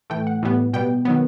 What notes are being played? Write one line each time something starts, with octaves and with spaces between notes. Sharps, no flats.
A2 E3 A3 G5
F#5
A2 E3 G3 B3
B2 G3 B3 G5
D#3 F#3 B3